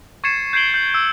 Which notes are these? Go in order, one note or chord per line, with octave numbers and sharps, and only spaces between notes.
C#6 G#6 A6 C7 C#7 E7
G6 G#6 C7 D7 F#7 G7
G6 F#7
E6